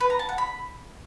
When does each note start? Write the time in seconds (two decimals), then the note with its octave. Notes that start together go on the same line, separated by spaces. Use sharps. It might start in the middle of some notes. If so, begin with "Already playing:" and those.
0.01 B4
0.10 A#5
0.19 A5
0.29 F#5
0.38 B5